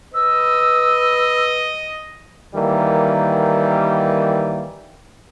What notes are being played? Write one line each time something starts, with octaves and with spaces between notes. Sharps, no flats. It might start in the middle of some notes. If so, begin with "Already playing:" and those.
B4 D#5 E6
D#3 E3 G3 A#3